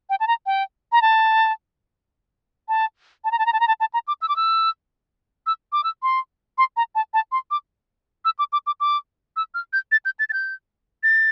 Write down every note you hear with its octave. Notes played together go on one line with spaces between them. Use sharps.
G5
A5
A#5
G5
A#5
A5
A5
A5
A#5
A5
A#5
A5
A#5
A5
A5
A#5
D6
E6
D6
E6
E6
D6
E6
C6
C6
A#5
A5
A5
C6
D6
E6
D6
D6
D6
D6
E6
F6
G6
A6
G6
A6
A6
G6
A6